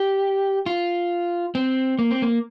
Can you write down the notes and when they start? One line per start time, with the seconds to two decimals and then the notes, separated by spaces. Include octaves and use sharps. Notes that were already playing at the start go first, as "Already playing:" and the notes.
Already playing: G4
0.66 F4
1.55 C4
1.99 A#3
2.11 C4
2.22 A#3